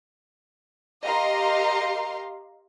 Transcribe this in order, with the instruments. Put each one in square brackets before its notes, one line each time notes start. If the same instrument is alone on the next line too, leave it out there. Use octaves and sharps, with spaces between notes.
[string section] G4 A#4 D#5 F5 A#5 C6